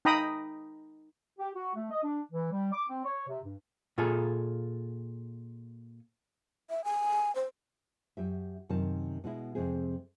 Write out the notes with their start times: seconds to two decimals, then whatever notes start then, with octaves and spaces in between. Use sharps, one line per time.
0.05 D#4 G5 A#5 B5 D#6
1.39 G4
1.55 F#4
1.75 A3
1.91 D#5
2.03 D4
2.32 E3
2.52 G3
2.73 D6
2.89 C4
3.05 C#5
3.28 C3
3.44 G2
3.98 A#2 F4 G#4 A4
6.70 E5
6.84 G#5
7.35 C5
8.17 F#2 G4 E5
8.69 F#2 C3 D#3 A#4 A5
9.24 B2 G#3 E4
9.55 F2 C3 G#3 C4 G#4